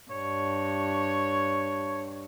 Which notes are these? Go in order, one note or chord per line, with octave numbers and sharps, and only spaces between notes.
G2 C#5